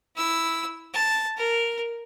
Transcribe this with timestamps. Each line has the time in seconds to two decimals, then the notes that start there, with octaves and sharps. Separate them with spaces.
0.16 E4 E6
0.94 A5
1.37 A#4